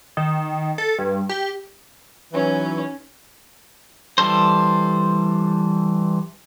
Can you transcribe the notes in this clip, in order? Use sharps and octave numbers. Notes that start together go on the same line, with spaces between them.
D#3
A4
G2
G4
E3 F#3 C#4 D#4
E3 G3 A4 C5